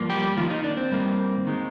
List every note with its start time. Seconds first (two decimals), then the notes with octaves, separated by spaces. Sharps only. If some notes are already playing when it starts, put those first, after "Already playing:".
Already playing: G2 F3 A#3
0.09 G3 G4
0.37 D#2 D#3 F3 A#3 F4
0.50 D#3 D#4
0.64 D4
0.77 C4
0.91 G2 D#3 G3 A#3
1.45 D#2 D#3 G#3